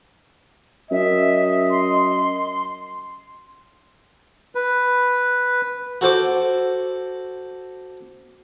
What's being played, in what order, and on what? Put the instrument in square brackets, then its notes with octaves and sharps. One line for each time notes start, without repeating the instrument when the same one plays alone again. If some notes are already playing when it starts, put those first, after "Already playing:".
[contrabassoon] F#2 [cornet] D#5 [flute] E5
[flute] C6
[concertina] B4
[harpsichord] F#4 A4 C5 D6